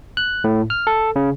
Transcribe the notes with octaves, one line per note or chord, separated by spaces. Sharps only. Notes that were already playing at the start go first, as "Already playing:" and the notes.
F#6
A2
F6
A4
C#3